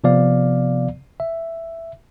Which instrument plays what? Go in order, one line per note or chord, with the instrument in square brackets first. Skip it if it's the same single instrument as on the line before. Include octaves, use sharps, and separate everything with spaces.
[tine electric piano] C3 F3 B3 D5 F5
E5